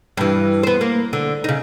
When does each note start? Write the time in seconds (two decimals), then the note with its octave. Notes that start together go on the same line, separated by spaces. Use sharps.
0.17 G2 E3
0.63 B3 C5
0.81 A#3
1.13 D3
1.44 C#3 D#4